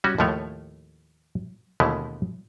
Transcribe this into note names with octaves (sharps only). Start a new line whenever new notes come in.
G3 C#4 F#4
D#2 A2 F3 A3 C#5
D#2 B2 D3 G#3 A3 E4